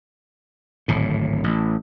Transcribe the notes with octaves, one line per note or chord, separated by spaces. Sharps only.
D1 G#1 A2
A1